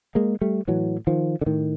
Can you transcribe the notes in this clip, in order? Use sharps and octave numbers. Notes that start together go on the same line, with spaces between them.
G#3 A#3
G3 A3
A2 E3 F#3
D#3 F3
D3
A2 D#3